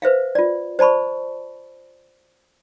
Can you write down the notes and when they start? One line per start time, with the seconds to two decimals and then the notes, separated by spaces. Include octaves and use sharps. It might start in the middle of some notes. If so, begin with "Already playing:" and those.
0.02 B4 C5 E5 F5
0.35 F4 D5
0.79 C5 D5 A5 B5 C#6